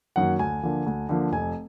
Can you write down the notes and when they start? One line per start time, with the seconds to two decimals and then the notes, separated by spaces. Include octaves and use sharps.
0.16 F#2 D#3 F#3 A#3 F#5
0.39 D2 G#5
0.63 D3 F3 A#3
0.86 D2
1.09 D3 F3 A#3
1.32 F1 G#5